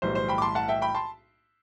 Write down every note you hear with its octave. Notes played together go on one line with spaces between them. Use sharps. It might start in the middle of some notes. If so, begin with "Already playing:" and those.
B1 A2 E3 G3 C5
C5
G5 B5
D6
A5 C6
F#5 A5
E5 G5
G5 B5
A5 C6